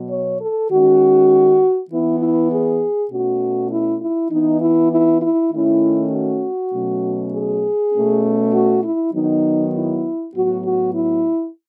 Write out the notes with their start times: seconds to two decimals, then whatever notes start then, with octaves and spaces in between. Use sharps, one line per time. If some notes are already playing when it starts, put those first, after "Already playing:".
Already playing: B2 F#3 B3
0.09 C#5
0.40 A4
0.70 D#3 G#3 C#4 F#4
1.89 E3 B3 E4
2.19 E4
2.51 G#4
3.10 B2 A3 C#4 F#4
3.71 E4
4.00 E4
4.31 E3 B3 D#4
4.60 E4
4.91 E4
5.21 E4
5.51 D#3 A3 C#4 E4
6.11 F#4
6.72 B2 F#3 A3 C#4
7.33 G#4
7.92 B2 A3 C#4
8.53 F#4
8.83 E4
9.13 D#3 F#3 B3 D#4
9.73 E4
10.33 A2 F#3 B3 F#4
10.63 F#4
10.93 E4